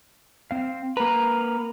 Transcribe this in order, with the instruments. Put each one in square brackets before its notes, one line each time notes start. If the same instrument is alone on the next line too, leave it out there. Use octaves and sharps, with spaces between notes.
[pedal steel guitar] C4 F5
[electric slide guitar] A#3 B4 [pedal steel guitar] A#5